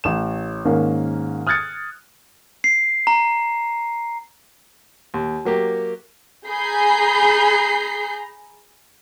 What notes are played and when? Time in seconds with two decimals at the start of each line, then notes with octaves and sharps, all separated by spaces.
0.04 A1 E7
0.65 G#2 D#3 A#3 C#4
1.47 D#6 F6 F#6 G#6 A6 C#7
2.64 C7
3.07 A#5
5.14 D#2
5.45 F#3 A#3 G4
6.47 G#4 A#5 B5 G6 C7